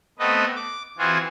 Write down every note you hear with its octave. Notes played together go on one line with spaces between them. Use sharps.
A3 B3 C4 B4 D#5
D6
E3 C4 F4 F#4 G#4